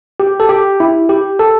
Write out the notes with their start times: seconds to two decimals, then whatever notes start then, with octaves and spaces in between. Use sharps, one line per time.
0.20 G4
0.40 A4
0.49 G4
0.80 E4
1.09 G4
1.39 A4